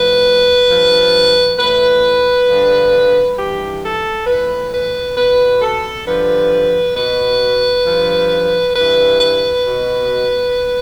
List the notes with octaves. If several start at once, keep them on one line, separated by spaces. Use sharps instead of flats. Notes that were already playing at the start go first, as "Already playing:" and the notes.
Already playing: A2 F3 B4
G2 F3
A2 E3 B4
G2 D3 F3
G2 E3 G4
A4
A2 E3 B4
B4
B2 B4
A4
G2 D3 F3 B4
B2 B4
G2 F3
G2 E3 B4
B4
B2